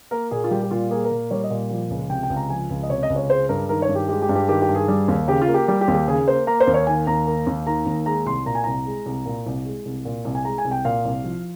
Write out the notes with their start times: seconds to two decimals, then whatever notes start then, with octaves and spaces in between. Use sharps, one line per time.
0.11 A#3 A#4
0.31 A#2 G#4
0.44 F4
0.51 G3 G4
0.63 G4
0.71 A#2 F4
0.91 A#3 G#4
1.04 A#4
1.11 A#2
1.31 G3 C#5
1.44 D#5
1.50 A#2
1.70 F3
1.90 C#2
2.10 C3 G5
2.23 G5
2.30 C#2
2.36 A#5
2.50 F3 G#5
2.70 C#2
2.83 D#5
2.89 C3 C#5
3.03 D#5
3.10 C#2
3.16 C#5
3.30 G#3 C5
3.49 G2 A#4
3.69 D#3 A#4
3.82 C#5
3.89 G2
3.95 G4
4.09 G#3 G4
4.22 G4
4.29 G2
4.35 G4
4.48 D#3 G4
4.62 G4
4.69 G2
4.75 G#4
4.88 G3
5.08 D#2
5.28 C#3 G4
5.41 F4
5.48 A#3
5.54 G4
5.68 G3 G4
5.81 G4
5.88 D#2
5.94 G4
6.08 C#3 G#4
6.28 A#3 C5
6.47 A#3 A#5
6.60 C5
6.67 D#2
6.74 C#5
6.87 D#3 G#5
7.07 D#2 A#5
7.27 A#3
7.47 D#2
7.66 D#3 A#5
7.86 D#2
8.06 G#3 A#5
8.26 C2 C6
8.46 A#2 A#5
8.55 G#5
8.64 C2 A#5
8.86 G#3
9.06 C2
9.26 A#2
9.46 C2
9.65 G#3
9.85 C2
10.05 A#2
10.25 C2
10.35 G#5
10.45 G#3 A#5
10.58 G#5
10.65 C2
10.71 G5
10.85 A#2 F5
11.05 C2
11.24 F3